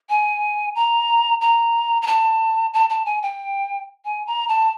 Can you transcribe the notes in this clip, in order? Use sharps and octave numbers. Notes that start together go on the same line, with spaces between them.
G#5
A#5
A#5
A#5
A5
A5
A5
G#5
G5
G#5
A#5
A5